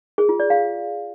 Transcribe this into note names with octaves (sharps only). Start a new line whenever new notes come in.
G#4
F4
D5
F5